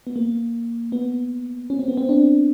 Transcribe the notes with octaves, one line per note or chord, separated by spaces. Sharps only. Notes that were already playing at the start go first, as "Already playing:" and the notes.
B3
A#3
B3
C#4
C4
B3
C4
D4